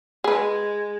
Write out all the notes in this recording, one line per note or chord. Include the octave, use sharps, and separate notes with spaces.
G#3 G#4 B4